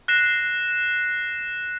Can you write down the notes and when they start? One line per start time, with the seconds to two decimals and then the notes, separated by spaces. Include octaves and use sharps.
0.08 F#6 A#6 C7 E7